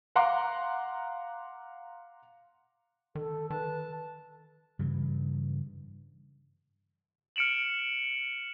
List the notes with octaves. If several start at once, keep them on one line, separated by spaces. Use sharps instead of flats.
F5 F#5 A#5 C6 D6
D#3 A4
D#3 B4 A5
G2 C#3 E3
F6 C#7 D7 E7 F#7